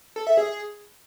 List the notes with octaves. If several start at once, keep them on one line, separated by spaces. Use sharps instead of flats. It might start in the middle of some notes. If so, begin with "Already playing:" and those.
A4
E5
G#4